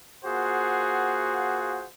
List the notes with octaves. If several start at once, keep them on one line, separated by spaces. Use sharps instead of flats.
A#3 F4 F#4 G#4 C5 F#5